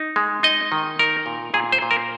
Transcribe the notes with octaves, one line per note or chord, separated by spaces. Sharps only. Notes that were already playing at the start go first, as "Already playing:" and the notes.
Already playing: D#4
G#3
D#4 D#5
D#3
D#4 A#4
A#2
A#2 G#4
C5
A#2
A#4